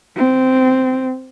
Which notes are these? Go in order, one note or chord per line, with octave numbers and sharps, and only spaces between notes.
C4